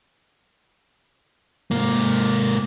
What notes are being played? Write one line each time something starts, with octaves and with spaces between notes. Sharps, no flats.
G#2 A#3